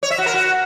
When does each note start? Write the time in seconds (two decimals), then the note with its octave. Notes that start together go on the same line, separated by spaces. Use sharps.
0.03 C#5
0.10 E5
0.18 F#4
0.26 A#4
0.34 F#4